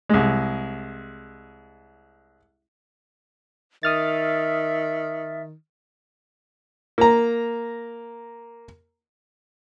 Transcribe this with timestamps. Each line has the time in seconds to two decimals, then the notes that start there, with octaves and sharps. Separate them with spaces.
0.09 C2 G#3
3.83 D#3 E5 D#6 F6 A6
6.98 A#3 A#5